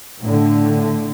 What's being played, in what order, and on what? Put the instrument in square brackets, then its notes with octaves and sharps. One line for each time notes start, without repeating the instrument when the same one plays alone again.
[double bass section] A2 D3